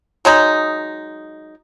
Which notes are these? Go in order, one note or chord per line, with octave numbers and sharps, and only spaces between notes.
F#3 G#3 D#4